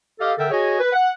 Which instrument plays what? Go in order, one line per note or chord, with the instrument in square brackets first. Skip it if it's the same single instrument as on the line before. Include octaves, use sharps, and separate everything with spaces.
[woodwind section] G4 A4 D#5 F5
D3 A4 A#4 E5 G5
F#4 G#4 C#5 D#5 G#5
B4
F#5